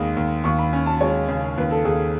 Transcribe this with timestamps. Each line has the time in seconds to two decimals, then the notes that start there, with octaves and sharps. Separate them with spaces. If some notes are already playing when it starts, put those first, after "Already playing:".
Already playing: D#2 D#3 G#3 B5 D#6
0.16 D#2
0.44 D#2 C#6
0.58 B5
0.73 C#4
0.86 A5
1.01 G#3 C#5
1.28 C#3
1.57 D#2 B4
1.71 A4
1.85 D#2 G#4